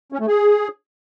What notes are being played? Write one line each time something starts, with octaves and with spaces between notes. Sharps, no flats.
C#4
A3
G#4